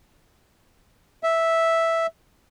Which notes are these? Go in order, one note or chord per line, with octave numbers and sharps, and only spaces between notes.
E5